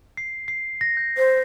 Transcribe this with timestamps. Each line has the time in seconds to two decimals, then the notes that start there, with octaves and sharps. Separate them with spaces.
0.17 C7
0.48 C7
0.81 A#6
0.97 G6
1.18 C5